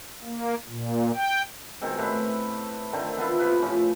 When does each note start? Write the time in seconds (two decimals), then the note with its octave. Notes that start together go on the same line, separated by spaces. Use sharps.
0.23 A#3
0.68 A#2
1.15 G5
1.81 B2 D#3 G#3 C4
1.98 A2 A3 C4 B4
2.93 D3 D#3 A3 C4
3.17 E3 B3 E4 F4
3.39 C3 F4 B4
3.62 A2 F3 C#4